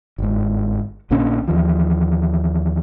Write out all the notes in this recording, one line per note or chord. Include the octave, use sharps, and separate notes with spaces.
G1 G#2
A#1 A#2 D3 C#4
D#2 E3 F3